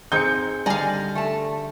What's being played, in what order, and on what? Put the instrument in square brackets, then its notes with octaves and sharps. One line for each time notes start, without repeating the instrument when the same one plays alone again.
[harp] D#3 G#4 C6 [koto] C4 D#4 [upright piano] G6 C#7
[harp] D3 G3 [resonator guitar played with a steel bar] D5 D#5 G#5 [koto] F5 A#5
[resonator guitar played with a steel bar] A3 A5